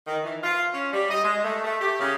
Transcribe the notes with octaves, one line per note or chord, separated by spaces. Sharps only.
D#3
E3
F4
C#4
G3
D#5
G#3
A3
A3
G4
C#3